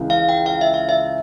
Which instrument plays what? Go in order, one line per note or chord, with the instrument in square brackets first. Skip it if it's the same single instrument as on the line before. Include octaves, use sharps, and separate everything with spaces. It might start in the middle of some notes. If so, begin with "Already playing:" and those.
Already playing: [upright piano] C#2 C#3 E3 G#3
[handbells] F5
G5
F5
E5
F5
E5